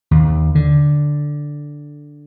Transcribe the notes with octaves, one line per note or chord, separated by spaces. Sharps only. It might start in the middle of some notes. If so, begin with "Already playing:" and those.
D#2
D3